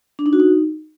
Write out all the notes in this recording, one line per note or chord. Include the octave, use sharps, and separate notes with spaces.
D4
D#4
F#4
D#4